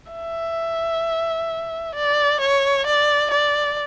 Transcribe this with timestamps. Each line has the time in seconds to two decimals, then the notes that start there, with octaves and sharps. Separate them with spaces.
0.12 E5
1.95 D5
2.41 C#5
2.87 D5
3.31 D5